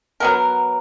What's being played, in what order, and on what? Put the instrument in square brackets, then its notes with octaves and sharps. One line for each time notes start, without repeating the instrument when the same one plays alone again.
[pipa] F#3 B3 A#4